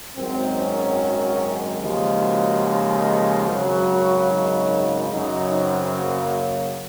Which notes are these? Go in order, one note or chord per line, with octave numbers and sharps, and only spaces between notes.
G#1 F#2 D#3 F#3 C4
C#4
D#2 C#3 F3 G#3 C#4
F#4
G#4
G#1 F#2 C#3 F#3 F#4
D#4
F#2 C#3 F#3 D#4
C4
A#3